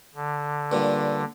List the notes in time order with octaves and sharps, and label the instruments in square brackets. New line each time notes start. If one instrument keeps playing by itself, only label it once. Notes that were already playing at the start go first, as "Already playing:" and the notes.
[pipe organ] D3
[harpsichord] G2 A#2